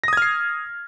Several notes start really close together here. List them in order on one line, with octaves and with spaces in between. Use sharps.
A#6 D#6 G#6 F6 C7